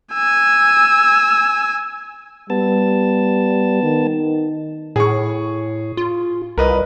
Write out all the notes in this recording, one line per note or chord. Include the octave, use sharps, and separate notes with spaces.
G#5 E6
G3 B3 A5
D#3
A2 G#4 C#6
F4
C2 A#4 B4 D#5